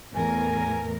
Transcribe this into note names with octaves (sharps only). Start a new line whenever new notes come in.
E2 A2 A#4 G#5